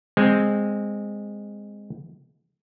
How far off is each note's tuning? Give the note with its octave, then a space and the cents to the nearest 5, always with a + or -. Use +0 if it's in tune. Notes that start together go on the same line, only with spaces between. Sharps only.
G#3 -10 C4 +0